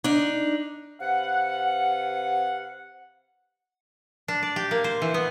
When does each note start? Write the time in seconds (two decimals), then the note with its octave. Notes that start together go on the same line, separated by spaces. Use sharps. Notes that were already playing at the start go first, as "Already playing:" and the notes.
0.04 D4 D#4
1.00 C3 B4 F5 F#5
4.28 D4
4.43 D5
4.56 G4
4.71 A#3
4.84 C5
5.02 E3
5.14 B3